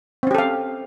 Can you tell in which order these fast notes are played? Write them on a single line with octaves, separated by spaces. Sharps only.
C4 C#4 G4 A4 F5